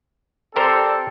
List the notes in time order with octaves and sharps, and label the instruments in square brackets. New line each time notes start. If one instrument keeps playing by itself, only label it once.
[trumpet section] C4 A4 D5 [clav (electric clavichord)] G4 A#4 C5